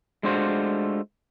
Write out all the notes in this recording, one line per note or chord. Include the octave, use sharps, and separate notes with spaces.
G#3 A3 D4 F4 F#4 C5